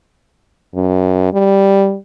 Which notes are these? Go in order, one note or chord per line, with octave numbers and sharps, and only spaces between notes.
F#2
G3